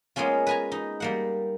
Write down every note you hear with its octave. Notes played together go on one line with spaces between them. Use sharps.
G#3 A#3 B3 C#4 F4
B4 G#5 A#5
D#4
G3 A#3 F#5